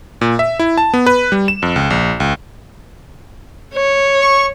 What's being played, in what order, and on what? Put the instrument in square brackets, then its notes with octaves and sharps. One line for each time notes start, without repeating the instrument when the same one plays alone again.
[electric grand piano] A#2
E5
E4
A5
B3
B4
G3
E7
F2
C#2
A#1
C#2
[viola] C#5
[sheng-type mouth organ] C#6